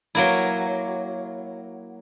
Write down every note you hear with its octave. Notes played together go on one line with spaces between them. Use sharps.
F#3 A#3 E4